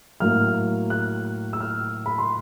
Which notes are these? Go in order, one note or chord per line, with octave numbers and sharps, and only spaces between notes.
A2 F#3 A#3 F6
F#6
E6
F6
B5
C6